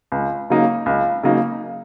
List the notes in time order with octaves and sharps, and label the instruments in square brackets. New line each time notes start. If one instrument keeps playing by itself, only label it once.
[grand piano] C#2
C#3 F#3 A#3 D#4
C#2
C#3 F#3 A#3 D#4